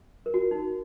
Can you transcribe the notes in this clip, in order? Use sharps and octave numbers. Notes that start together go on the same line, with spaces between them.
A#4
F#4
D#4